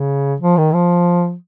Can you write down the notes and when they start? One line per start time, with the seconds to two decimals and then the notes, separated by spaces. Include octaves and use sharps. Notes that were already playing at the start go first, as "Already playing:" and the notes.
Already playing: C#3
0.40 F3
0.58 D#3
0.74 F3